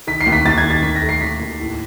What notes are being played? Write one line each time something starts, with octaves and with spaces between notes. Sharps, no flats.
D#3 B6
C7
D#2
B6
D#2 A6
G#6
D#3
A6
D#2 B6
A#6
A3
C7
D#2 B6
D#2
A2